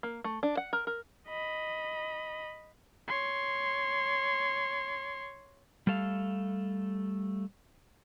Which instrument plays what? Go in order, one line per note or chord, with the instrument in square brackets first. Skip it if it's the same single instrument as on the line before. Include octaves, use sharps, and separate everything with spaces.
[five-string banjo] A#3
A3
D4
F#5
A#4
A#4
[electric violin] D#5 B5
C#5 C6
[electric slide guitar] G3 A3 A4 F5